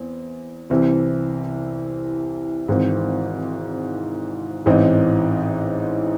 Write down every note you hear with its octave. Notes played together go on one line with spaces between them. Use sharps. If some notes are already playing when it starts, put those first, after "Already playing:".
Already playing: E2 C4
C2 C3 E3 C4 E4
G#1 G#2 E3 C4
A1 G#2 E3 C4 D#4